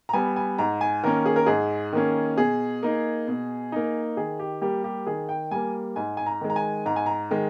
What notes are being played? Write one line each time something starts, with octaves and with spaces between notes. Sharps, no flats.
A#5
G3 B3 G#5
G#5
G#2 A#5
G#5
D#3 A#3 C#4 A#4
G#4
A#4
G#2 G#4
D#3 A#3 C#4
B2 G#4
A#3 D#4
B2
A#3 D#4
D#3 G#4
G4
G3 A#3 G4
G4
D#3 G#4
G5
G3 A#3 G#5
G#2 G#5
G#5
A#5
D#3 G#3
A#5
G#5
G#2 A#5
G#5
A#5
D#3 G#3